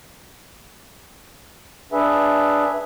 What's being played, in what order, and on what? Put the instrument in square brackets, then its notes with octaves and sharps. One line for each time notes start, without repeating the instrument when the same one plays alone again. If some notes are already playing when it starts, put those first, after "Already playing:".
[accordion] D4 G#4 B4 E5